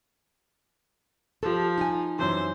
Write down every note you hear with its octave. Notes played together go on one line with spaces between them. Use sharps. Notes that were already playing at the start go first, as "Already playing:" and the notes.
F3 G4 A4
D#4 G#5
F#2 E3 C5